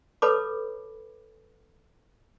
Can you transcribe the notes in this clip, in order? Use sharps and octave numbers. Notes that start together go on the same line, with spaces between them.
A4 B4 C#5 A5 B5 D6